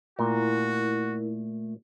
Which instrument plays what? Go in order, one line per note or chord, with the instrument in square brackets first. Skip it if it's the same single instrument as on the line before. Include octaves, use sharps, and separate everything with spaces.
[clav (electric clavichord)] A#2 [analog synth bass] A3 [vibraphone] E4 A#4 [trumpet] F#4